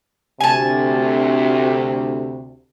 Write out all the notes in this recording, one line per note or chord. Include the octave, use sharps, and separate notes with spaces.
D2 C3 G#5 A5